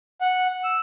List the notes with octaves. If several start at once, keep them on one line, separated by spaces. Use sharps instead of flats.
F#5
E6